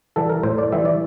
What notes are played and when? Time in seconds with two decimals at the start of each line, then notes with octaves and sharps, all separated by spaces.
0.16 E3 G3 A4
0.29 A#4
0.43 A2 C5
0.58 D5
0.72 E3 G3 E5
0.85 D5